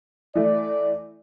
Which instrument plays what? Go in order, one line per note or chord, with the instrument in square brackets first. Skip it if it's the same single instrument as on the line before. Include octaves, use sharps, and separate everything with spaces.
[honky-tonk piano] E3 A3 [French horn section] D5